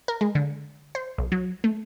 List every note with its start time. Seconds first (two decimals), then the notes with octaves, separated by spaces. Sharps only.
0.08 A#4
0.21 G#3
0.35 D3
0.95 C5
1.18 B1
1.32 F#3
1.64 A3